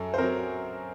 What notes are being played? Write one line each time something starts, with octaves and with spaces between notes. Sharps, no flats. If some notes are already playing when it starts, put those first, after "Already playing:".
Already playing: F#2 A4
C5
F#3 C4 A#4